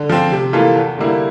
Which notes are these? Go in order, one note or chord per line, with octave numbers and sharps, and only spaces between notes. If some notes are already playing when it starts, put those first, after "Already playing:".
Already playing: D3
F3 C4
C3
E3 A#3 F4 A4
E2
D3 G3 A#3 E4